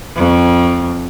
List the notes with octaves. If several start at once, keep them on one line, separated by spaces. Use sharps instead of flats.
F2